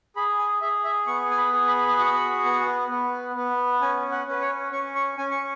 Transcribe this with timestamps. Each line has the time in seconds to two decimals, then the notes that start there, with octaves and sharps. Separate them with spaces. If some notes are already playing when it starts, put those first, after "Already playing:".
0.16 G#4 B5
0.39 G#5
0.62 G#4 E5
0.85 E5
1.07 B3 C#6
1.31 G#5
1.38 B5
1.53 G#4
1.68 B5
1.99 F#4
2.44 B3
2.90 B3
3.35 B3
3.82 C#4 G#5
4.11 F#5
4.27 C#4 B4
4.42 C#5
4.72 C#4 C#6
4.95 C#6
5.18 C#4 G#5
5.31 C#6